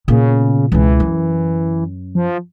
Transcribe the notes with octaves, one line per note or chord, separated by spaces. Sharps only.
A#2 C#3 B3
C#2 B2 E3
F#2
F3